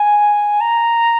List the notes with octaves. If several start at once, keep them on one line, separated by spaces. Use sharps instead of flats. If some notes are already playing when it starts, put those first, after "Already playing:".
Already playing: G#5
A#5